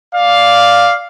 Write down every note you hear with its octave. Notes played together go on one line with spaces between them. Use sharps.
D5 F5